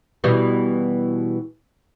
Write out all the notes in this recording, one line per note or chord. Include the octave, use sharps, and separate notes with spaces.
B2 E3 G3